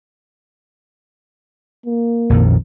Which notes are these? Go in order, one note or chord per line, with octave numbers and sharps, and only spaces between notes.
A#3
A#1 F2 D#3